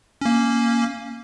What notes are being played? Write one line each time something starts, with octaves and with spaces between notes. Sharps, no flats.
A#3 C#4